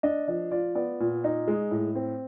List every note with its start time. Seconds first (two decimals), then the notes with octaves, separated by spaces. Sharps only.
0.03 D4 D#5
0.28 F3 D#5
0.51 F4 D5
0.75 B3 D5
1.00 A#2
1.24 D#4
1.48 G#3
1.71 A2
1.95 C4